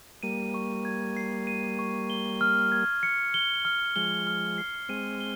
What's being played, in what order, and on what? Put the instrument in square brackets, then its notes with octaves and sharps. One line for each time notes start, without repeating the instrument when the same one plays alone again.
[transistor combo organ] G3 A#3 [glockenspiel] D#7
[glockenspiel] C#6
G#6
C7
D#7
C#6
G7
F6
G#6
C#7
G7
F6
[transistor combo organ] F3 G#3 [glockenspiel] G7
[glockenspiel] F6
C7
[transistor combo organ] G#3 C4 [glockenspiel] D#7
[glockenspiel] G7